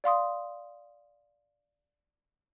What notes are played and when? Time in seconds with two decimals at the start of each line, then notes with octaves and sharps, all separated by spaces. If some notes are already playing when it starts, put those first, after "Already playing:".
0.04 D5 F5 C6 D#6